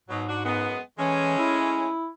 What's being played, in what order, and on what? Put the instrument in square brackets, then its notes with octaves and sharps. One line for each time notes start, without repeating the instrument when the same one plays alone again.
[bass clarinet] G#2 [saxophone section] B2 F#3
[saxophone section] D4 F#4
F#2 G#3 B3
[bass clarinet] E3 [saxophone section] G#3 A3 C#4
[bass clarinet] E4